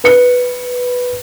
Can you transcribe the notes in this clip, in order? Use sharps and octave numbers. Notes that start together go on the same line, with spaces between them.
B4 C#7